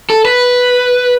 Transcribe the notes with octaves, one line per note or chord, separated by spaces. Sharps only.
A4
B4